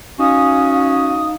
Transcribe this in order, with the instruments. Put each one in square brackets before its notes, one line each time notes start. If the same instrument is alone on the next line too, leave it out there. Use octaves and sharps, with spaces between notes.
[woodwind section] C#4 F#4 [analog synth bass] D#4 [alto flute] F5 [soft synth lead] D#6